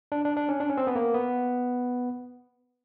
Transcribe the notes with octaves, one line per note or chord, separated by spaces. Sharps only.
D4
D4
D4
C#4
D4
C#4
C4
B3
A#3
B3